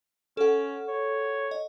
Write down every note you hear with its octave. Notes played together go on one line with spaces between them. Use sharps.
C#4 A4 F#5
C#5
D#5